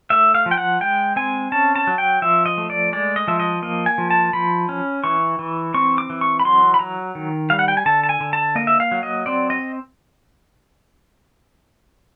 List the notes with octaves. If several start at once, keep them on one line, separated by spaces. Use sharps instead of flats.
A3 E5
F5
F3
G5
F#5
G#3 G5
C4 G#5
C#4 A5
A5
F#3
G5
F3 E5
D#5
A3
D5
G#3 D5
D#5
F3 E5
D#5
A#3 D#5
G#5
F3
A5
F3 B5
C#4
E3 C#6
E3
C4 C#6
D6
E3
C#6
B5
F#3 C6
B5
F#3 A#5
D#3
G3 F5
F#5
G5
G#5
D3 A5
A5
G#5
D3
A5
A#3 D#5
E5
F5
F#3
D#5
C4 D5
D#5